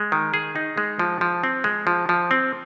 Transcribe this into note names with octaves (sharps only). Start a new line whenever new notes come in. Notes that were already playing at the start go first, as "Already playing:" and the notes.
Already playing: G#3
D#3
G#4
D#4
G#3
F3
F3
C4
G#3
F3
F3
C4